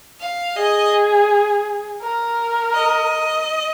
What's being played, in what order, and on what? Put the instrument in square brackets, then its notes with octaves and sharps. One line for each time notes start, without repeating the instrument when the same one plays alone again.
[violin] F5
[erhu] G#4 [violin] D#5
[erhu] A#4
[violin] D#5